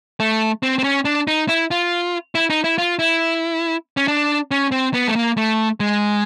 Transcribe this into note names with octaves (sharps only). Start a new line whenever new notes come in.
A3
C4
C4
C#4
D4
D#4
E4
F4
E4
D#4
E4
F4
E4
C#4
D4
C#4
C4
B3
A3
A#3
A3
G#3